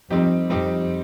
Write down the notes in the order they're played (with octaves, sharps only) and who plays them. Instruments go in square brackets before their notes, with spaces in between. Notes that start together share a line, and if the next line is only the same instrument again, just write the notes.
[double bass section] F2 [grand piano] G3 C4 D#4 G4
[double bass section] F2 [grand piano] G3 C4 D#4 G4